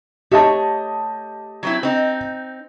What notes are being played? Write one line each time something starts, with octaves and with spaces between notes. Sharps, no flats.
A3 G4 C#5 D#5 A5
F#3 C4 E4
C4 D#4